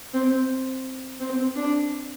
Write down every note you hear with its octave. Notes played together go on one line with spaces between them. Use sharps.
C4
C4
D4